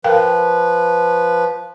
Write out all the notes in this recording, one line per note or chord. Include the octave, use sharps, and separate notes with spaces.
F3 A#4 B4 F5 G5